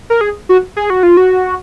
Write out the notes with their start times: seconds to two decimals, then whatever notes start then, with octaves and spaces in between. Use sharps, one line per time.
0.10 A#4
0.21 G#4
0.49 F#4
0.77 G#4
0.90 F#4
1.03 F4
1.17 F#4